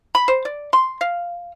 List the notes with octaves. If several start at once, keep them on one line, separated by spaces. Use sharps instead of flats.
B5
C5
D5
C6
F5